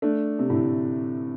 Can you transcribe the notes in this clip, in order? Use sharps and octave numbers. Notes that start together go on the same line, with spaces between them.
A3 D4
C3
A2 D3